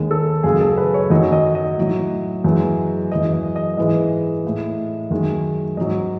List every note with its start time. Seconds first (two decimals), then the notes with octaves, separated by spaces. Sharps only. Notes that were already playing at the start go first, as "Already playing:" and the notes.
Already playing: D#2 D#3 G#3
0.11 A4
0.43 F#2 C#3 G#3 G#4
0.60 A4
0.77 B4
0.94 C#5
1.10 F#2 D#3 F#3 D#5
1.32 D#5
1.55 D#5
1.77 A2 F#3
2.44 F#2 E3 G#3
3.12 F#2 E3 G#3 D#5
3.33 D#5
3.56 D#5
3.77 G#2 E3 G#3 D#5
4.44 A2 G#3
5.11 F#2 D#3 G#3
5.77 G#2 F#3 D#5